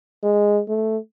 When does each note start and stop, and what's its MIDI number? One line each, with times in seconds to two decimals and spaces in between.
0.23 0.61 56
0.68 0.97 57